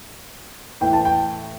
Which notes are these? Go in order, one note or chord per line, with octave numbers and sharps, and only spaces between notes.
A2 E3 A3 E4 B4 G5
A5
G5